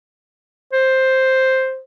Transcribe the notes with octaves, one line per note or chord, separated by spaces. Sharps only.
C5